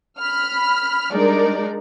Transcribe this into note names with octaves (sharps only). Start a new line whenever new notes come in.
B5 F6
G3 G#3 D4 D#4 A#4 D5